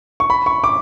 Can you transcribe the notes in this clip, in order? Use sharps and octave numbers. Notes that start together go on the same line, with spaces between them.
C#6
B5
C#6
D6